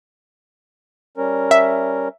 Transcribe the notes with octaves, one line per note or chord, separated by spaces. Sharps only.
G3 C#4 A#4
E5